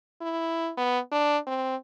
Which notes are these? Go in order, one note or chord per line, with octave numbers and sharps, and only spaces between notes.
E4
B3
D4
C4